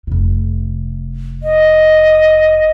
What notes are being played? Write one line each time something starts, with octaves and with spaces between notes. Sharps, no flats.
F1 C3
D#5